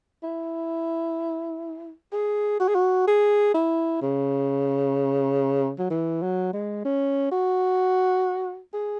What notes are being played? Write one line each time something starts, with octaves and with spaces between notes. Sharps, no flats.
E4
G#4
F#4
G#4
F#4
G#4
E4
C#3
F#3
E3
F#3
G#3
C#4
F#4
G#4